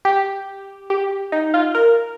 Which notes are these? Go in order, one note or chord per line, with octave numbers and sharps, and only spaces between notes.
G4
G4
D#4
F4
A#4